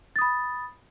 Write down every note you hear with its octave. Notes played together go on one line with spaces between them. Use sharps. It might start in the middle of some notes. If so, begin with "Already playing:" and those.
B5 D#6 A6